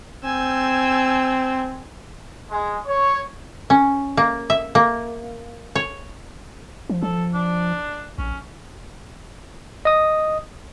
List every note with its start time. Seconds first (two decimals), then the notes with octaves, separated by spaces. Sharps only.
0.24 C4 G#5 E6 G6
2.49 G#3
2.87 C#5
3.70 C#4
4.17 A#3
4.50 E5
4.75 A#3
5.75 C#5
6.90 F3
7.03 F3 A4
7.34 D4
8.18 A#1 C#4
9.85 D#5 D#6